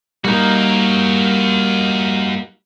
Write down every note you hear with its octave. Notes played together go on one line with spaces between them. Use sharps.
G3 A#3 D#4 F#4 A#4